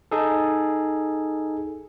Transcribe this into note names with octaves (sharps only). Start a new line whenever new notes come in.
D#4 G#4 A4